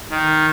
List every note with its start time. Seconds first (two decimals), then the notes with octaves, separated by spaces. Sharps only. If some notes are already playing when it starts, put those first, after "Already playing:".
0.10 D#3